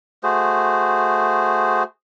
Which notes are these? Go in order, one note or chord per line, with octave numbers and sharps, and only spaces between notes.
A3 F#4 G#4 C5